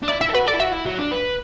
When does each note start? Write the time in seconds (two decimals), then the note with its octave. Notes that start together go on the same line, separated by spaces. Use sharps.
0.03 D4
0.08 E4 D5
0.21 E4 E5
0.29 A4
0.34 F#4 B4
0.46 A4 D5
0.55 E4
0.60 F#4 E5
0.73 E4
0.86 F#3
0.98 D4
1.11 B4